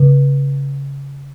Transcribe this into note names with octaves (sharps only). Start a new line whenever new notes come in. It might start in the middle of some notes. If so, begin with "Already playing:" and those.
Already playing: C#3